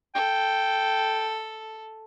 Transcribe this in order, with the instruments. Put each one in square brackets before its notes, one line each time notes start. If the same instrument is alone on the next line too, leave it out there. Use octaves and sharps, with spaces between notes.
[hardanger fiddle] A4 [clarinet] G5